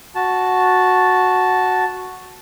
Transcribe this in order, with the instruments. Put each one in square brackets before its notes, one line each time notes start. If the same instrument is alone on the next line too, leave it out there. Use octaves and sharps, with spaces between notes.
[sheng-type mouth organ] F#4 A5